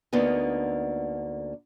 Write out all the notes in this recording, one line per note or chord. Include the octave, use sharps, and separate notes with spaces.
D2 D3 A#3 B3 D#4